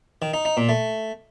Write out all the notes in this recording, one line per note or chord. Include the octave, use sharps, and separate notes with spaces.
D#3
D#4
D#4
A#2
A3